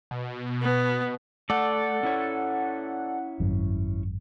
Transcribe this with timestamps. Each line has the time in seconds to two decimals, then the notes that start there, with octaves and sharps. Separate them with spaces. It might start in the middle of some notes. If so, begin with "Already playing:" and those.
0.11 B2
0.62 B3
1.50 A3 A4 D5 F#5
2.03 C#4 E4 C#5
3.40 G#1 F#2